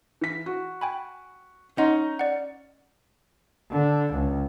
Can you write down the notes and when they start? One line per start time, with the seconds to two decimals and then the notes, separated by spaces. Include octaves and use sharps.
0.21 E3 B6
0.46 F#4
0.81 G5 G#5 B5
1.78 C#4 D#4 F#5 C6
2.19 D5 F#5
3.71 D3
4.14 C#2